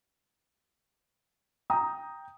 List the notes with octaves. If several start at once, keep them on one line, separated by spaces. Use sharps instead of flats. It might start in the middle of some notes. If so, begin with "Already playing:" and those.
G5 A#5 D#6